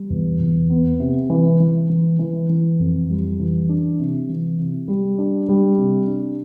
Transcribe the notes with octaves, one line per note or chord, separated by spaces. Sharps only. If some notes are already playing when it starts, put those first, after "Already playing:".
Already playing: G3
E2
E2
B3
C3
E3
E3
E3
E3
E3
F2
G3
E3
D4
C3
E3
C3
G3
D4
G3
C3
D4